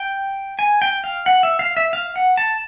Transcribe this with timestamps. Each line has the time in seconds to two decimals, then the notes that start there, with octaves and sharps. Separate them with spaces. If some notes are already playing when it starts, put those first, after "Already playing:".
Already playing: G5
0.59 G#5
0.82 G5
1.04 F5
1.26 F#5
1.43 E5
1.59 F5
1.77 E5
1.93 F5
2.16 F#5
2.37 A5